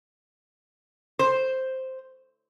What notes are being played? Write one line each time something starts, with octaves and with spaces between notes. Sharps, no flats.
C5